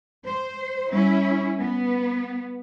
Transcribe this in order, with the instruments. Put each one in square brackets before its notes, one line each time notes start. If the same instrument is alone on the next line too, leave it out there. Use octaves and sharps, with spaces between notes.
[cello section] C5
[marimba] G3 [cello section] C#4 E4
[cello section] B3